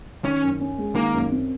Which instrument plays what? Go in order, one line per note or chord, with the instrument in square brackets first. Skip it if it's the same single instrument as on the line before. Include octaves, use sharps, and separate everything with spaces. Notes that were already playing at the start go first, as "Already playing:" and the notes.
[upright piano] D#3 [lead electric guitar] C#4
[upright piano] F#2
C#4
G#3
[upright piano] D#3 [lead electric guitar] A#3
[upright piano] F#2
C4